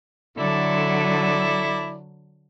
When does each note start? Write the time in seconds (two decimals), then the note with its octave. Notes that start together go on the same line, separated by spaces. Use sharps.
0.38 D3 F#3 E4 A4 D5